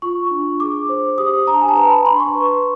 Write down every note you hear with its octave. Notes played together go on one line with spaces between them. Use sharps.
F4 C#6
D4
G#4 D6
C5
G4 D#6
D4 A#5
A5
G#5
A5
B4 A#5
B5
D4 C6
C#6
B4